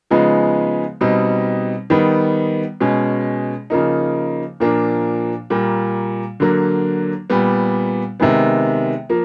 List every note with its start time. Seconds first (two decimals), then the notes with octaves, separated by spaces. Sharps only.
0.11 C#3 F3 G#3 B3 D#4
1.01 B2 G3 C4 D#4
1.90 D#3 G3 B3 D#4
2.81 B2 G#3 C#4
3.70 C#3 F3 A#3 D#4
4.60 A#2 F3 A#3 D4
5.50 A#2 G3 A#3
6.40 D3 F#3 A#3
7.30 A#2 G3 B3
8.20 C3 D#3 G#3 B3
9.09 F3 A#3